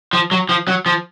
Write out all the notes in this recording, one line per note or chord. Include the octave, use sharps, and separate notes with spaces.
F3
F#3
F3
F#3
F3